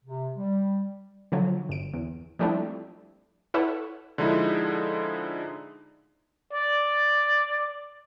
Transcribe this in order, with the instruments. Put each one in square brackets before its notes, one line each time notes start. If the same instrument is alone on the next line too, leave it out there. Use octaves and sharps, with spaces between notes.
[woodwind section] C3
G3
[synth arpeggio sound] D3 F3 F#3
G1 D7
E2
F3 G3 A3 C4 D4 E4
E4 A4 B4 C#5 F#5
[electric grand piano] D3 F3 G#3 D#4 E4
[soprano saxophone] D5